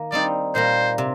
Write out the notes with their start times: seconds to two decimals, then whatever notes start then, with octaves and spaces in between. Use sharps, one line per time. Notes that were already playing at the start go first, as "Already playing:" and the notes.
Already playing: D#3 A#3
0.12 G3 C4 D#4 D5
0.55 A#2 G3 A#3 C5
0.98 C3